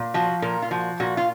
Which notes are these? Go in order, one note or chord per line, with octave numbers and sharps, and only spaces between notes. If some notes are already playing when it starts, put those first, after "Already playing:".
Already playing: A#2
F3 F#4
A#2 A#4
F4
F3 F#4
A#2 F#4
F4